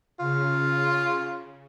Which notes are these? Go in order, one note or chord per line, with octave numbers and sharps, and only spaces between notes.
C#3 F4